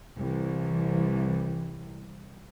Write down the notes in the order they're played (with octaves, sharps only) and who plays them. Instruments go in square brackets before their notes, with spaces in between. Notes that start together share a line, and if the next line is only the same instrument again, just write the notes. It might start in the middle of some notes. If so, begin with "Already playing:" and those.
[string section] C2 E3